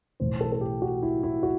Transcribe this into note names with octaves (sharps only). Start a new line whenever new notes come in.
B1 A2 E3 C5
A4
A4
G4
F#4
E4
E4
F#4